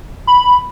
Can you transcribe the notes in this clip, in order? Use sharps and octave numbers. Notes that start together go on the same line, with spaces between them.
B5